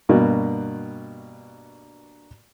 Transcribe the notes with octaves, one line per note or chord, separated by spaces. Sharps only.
G2 B2 A#3 F#4